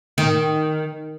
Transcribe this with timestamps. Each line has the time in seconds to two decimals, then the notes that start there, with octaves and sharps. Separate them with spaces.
0.18 D#3